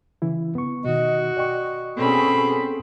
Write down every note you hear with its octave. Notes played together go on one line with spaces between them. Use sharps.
C#3 E3 E4
B3 C#6
B2 D#3 F#4 D#5
D5 D#5 G5 C#6
B2 C4 C#4 G#4 A4 B5